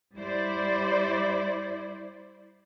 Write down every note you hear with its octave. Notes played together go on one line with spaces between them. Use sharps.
G3 E4 C5 D5